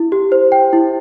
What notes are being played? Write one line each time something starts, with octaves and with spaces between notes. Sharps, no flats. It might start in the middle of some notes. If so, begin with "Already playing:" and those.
Already playing: E4
G4
C5
G5
E4